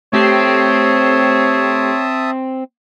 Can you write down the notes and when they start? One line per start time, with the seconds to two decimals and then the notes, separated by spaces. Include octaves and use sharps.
0.13 A3 C4 G4 C#5 E5 A5 D#6 C7